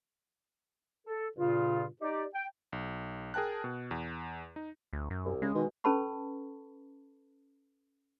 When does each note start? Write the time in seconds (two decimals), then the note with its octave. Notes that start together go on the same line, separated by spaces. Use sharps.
1.07 A4
1.37 G2 A#2 C#3 F4
2.01 D#4 G4 D5
2.35 G5
2.72 B1
3.34 G#4 A#4 G5 A5 F#6
3.64 B2
3.91 E2
4.56 D#4
4.93 D2
5.10 F#2
5.25 C2
5.42 C#3 G#3
5.55 B2 D#3
5.84 C#4 A4 B4 A5 B5 C#6